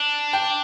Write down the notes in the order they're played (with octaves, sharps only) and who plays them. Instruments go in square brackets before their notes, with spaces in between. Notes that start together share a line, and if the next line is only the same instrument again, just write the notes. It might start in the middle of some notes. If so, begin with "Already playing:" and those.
Already playing: [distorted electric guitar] D4
[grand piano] G5